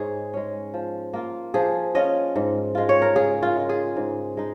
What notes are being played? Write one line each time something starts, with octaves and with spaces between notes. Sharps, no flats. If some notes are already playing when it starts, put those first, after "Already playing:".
Already playing: G#2 G#3 D#4 G#4 C#5 D#5
G#3 C#4
F3
A#3 F4
F3 G#4
C#4 F4 D#5
G#2
G#3 F4
C#5
A#4
C#3 G#4
F4
G#3 F4
G#4
G#2
G#3 D#4